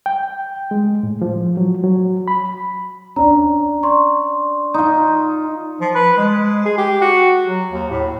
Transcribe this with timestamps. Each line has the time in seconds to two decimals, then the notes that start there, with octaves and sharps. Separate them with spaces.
0.06 G5
0.71 G#3
1.03 A2
1.22 F3
1.57 F#3
1.84 F#3
2.28 B5
3.16 C#4 D4 A#5
3.83 D5 C6 C#6
4.74 D#4 F4
5.81 F3
5.95 B4
6.17 G#3
6.65 G#4
6.78 G4
7.01 F#4
7.47 F#3
7.72 D#2
7.90 A2